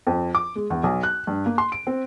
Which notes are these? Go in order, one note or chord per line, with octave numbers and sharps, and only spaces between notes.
F2
D6
G#3
E2
B1
F#6
G2
A#3
C6
D7
C4